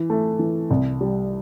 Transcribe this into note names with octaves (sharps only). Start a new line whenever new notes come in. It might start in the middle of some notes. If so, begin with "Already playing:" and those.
Already playing: E3
A3
E3
C2
G3